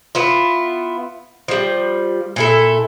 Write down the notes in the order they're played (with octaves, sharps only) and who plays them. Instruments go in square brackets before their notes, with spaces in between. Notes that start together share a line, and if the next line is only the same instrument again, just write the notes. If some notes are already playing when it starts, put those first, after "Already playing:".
[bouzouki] B3 E4 F4
F3 G3
A#2 E4 A4